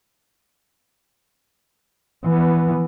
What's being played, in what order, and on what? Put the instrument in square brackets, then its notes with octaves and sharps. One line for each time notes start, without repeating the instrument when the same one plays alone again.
[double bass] E3 B3